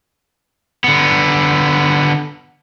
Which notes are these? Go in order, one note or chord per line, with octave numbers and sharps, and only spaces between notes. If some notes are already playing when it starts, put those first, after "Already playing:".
D3 B3